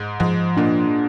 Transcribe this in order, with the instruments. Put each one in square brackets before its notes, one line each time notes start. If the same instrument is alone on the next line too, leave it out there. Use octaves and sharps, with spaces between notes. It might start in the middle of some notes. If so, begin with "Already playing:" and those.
Already playing: [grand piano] G#2
[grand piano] G#2 [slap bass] F3
[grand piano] A#2 [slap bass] D4